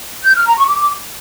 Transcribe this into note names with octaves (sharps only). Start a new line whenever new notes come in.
G6
F6
A#5
C#6
D6